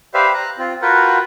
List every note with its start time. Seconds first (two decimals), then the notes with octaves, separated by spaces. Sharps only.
0.14 G4 B4 C5 D5 E5 F5
0.34 A#5 F#6
0.58 C4 F4
0.82 F4 F#4 A#4 B4 F#5 G5